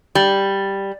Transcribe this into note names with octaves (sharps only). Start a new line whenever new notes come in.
G3